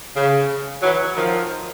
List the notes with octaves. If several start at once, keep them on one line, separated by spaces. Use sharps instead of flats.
C#3
E3 F#3
D#3 F3